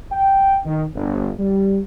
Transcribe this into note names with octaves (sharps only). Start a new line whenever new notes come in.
G5
D#3
G1
G3